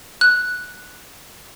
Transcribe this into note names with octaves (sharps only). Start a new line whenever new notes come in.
F#6